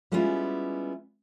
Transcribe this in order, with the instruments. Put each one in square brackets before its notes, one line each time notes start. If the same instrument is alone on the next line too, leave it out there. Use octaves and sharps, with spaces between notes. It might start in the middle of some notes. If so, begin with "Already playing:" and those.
[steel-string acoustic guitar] G3 G#3 B3 C#4 E4 F4